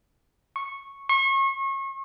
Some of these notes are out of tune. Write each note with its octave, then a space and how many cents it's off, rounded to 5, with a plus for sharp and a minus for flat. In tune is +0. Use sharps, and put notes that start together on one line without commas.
C#6 -10
C#6 -35